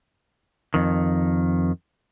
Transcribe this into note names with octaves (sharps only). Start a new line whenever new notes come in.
F2 D#3